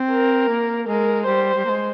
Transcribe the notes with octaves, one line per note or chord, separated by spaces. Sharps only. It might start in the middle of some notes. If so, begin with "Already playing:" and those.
Already playing: C4
A#4
A#3
G#3 A#4
G3 C5
G3
A#3
G#3